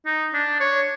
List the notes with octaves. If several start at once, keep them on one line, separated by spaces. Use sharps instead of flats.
D#4
D4
C#5